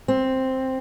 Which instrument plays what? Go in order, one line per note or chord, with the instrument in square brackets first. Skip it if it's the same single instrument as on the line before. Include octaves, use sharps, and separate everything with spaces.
[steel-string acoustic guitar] C4